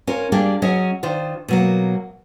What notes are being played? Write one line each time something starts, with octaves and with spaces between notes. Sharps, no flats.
C#4 F4 A#4
G3 A#3 D4 G4 G#4 F5
F#3 C#4 G#4 D#5
D#3 D4 F4 C5
B2 F#3 A#3